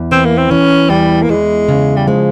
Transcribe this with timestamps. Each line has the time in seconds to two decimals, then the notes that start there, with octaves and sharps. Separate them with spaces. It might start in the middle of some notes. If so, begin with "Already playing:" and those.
Already playing: E2
0.12 E3 C4
0.25 A#3
0.38 C4
0.51 E3 C#4
0.90 E2 G3
1.22 A#3
1.29 E2 G#3
1.68 C#3
1.97 G3
2.07 F3 G#3